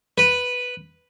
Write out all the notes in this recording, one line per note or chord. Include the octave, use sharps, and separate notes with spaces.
B4